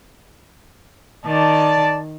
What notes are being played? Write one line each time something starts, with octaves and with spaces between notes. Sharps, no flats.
D#3 D5 A5